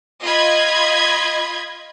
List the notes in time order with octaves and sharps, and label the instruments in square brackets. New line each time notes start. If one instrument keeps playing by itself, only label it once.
[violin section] F4 D#5 B5 G#6